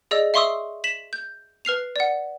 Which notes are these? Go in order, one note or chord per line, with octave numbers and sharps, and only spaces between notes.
G#4 D5 D#5 E6
E5 F5 C6 C#6 D#6 E6
B6 E7 F#7
G6
B4 F6 C7 F7
D5 F#5